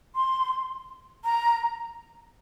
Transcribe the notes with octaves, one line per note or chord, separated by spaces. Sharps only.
C6
A#5